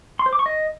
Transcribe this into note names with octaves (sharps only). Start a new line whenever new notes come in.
C6
C5
D6
C#6
D#5